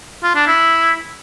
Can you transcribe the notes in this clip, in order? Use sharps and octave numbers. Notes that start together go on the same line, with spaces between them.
F4
D4
E4